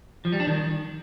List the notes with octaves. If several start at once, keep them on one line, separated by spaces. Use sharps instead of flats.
F3
G3
D4
D#3